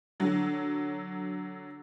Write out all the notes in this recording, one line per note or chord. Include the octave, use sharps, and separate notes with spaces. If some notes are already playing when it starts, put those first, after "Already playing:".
D3 F#3